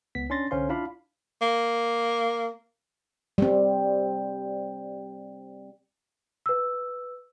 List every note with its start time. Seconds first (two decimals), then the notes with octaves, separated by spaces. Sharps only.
0.15 C#2 B3 B6
0.30 C#4 D4 C6 A6 A#6
0.51 C2 D3 C#4 C5 F5 C6
0.69 D4 E4 F4 D5 F5 B5
1.41 A#3
3.38 G3 C4
6.46 B4 E6